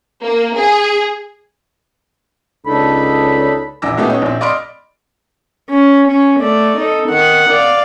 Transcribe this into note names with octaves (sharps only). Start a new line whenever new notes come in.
A#3
G#4
C#2 D4 D#4 A4 B5
A#1 E2 D6 E6 A#6
A#2 G#3 A3 B3 D#4 G4
B3 C#4 D#4
A#1 C4
D5 D#5 B5 C6 F6 D7
C#4
C#4
A3 D5
D#4 A4
D#3 F#5
D5 F5